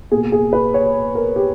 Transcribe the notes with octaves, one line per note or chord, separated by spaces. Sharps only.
B2 A#3 G#4
G#4
B4
C#5
A#4
G4